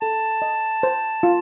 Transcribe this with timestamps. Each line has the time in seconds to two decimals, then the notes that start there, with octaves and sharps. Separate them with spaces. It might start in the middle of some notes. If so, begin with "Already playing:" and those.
0.01 A4 A5
0.42 D#5
0.83 C5
1.23 F4